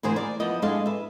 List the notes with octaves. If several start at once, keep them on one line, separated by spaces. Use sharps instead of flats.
D2 E3 G#4 A#4 C5
A#4 D5
F3 B3 E4 D#5
G#3 D4 G#4 A4 D#5 F5
B4 E5